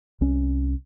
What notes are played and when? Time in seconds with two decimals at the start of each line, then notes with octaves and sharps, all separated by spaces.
0.21 C2 C#4